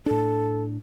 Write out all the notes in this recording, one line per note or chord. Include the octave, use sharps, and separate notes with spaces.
A2 D4 A4